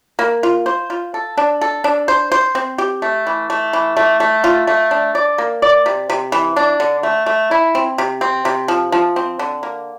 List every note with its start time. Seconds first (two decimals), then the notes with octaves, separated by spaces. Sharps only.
0.19 A#3
0.43 F4
0.66 C5
0.90 F4
1.14 A4
1.37 D4
1.61 A4
1.84 D4
2.08 C5
2.32 C5
2.55 C4
2.78 G4
3.02 A3
3.27 E3
3.50 A3
3.73 E3
3.97 A3
4.20 A3
4.44 F4
4.67 A3
4.91 D4
5.15 D5
5.38 A#3
5.62 D5
5.86 C3
6.10 C3
6.32 E3
6.56 D4
6.80 D3
7.03 A3
7.26 A3
7.51 E4
7.75 C4
7.98 C3
8.21 C4
8.45 C3
8.68 F3
8.92 F3
9.16 C4
9.39 D3
9.63 A#3